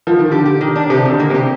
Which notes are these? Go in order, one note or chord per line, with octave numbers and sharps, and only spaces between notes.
F3
D#3
D3 G4
G4
D#3
D4
C3 G4
D3 D#3
A#3
C3
G4